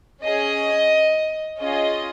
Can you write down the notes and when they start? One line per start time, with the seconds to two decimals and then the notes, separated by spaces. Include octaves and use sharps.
0.24 C#4 G#4 D#5
1.60 C#4 F4 G#4 D#5